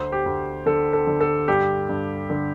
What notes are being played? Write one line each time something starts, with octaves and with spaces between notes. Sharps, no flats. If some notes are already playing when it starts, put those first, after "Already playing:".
Already playing: D2 C5
G4
D2
D3 A4
A4
D3
A4
G2 G4
G2
D3